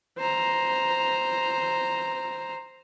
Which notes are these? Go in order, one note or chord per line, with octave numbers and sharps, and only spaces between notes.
C5 A#5